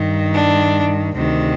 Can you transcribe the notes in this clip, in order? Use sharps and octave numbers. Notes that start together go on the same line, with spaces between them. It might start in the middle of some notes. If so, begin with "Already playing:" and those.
Already playing: G2 D#3
D4
D2 C3 D#3